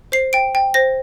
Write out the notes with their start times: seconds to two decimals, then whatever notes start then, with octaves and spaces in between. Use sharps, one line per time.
0.12 C5 C7
0.33 G5 D7
0.55 G5
0.74 C5 A#6